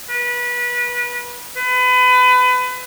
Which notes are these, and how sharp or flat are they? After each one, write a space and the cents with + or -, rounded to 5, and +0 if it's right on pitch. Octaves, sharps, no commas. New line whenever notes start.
B4 -25
B4 +30